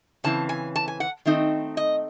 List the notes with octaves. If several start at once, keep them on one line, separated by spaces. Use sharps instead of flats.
C#3 E3 C4 A5
G#5
A5
G#5
F#5
D#3 A3 C4 D#4
D#5